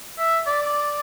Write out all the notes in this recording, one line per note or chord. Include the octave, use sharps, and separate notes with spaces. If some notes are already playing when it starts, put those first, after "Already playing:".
E5
D5